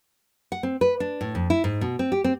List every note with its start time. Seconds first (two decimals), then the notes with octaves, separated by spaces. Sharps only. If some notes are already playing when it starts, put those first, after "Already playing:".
0.52 F#5
0.63 C4
0.81 B4
1.00 D4
1.21 A2
1.35 F2
1.50 E4
1.64 G#2
1.81 B2
1.99 C4
2.12 G4
2.24 C4